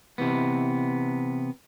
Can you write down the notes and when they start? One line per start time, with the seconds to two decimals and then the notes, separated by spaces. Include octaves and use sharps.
0.18 C3 E3 B3